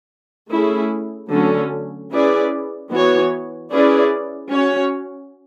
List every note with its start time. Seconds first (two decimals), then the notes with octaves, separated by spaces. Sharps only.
0.52 A3 C#4 E4 G#4
1.32 D3 F#3 A3 C#4
2.11 C#4 E4 G#4 B4 D5
2.91 E3 B3 F#4 C#5
3.71 C#4 E4 G#4 B4 D5
4.50 C#4 F#4 C#5